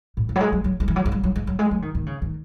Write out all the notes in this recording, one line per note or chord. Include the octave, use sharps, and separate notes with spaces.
A2
C#3
F#3
G#3
F#3
F#3
G#3
E3
F#3
G#3
F#3
F#3
G#3
F#3
G#3
F#3
D#3
D#3
C#3
D#3